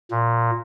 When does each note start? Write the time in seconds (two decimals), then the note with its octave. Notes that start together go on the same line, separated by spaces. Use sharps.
0.11 A#2